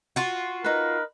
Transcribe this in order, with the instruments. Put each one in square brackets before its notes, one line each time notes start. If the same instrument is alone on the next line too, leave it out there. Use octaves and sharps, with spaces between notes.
[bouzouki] F4 F#4
[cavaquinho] D#4 B4 [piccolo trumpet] A#4